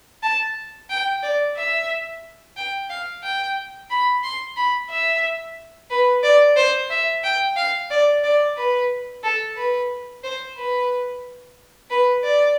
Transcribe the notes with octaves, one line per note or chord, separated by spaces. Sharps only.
A5
G5
D5
E5
G5
F5
G5
B5
C6
B5
E5
B4
D5
C5
E5
G5
F5
D5
D5
B4
A4
B4
C5
B4
B4
D5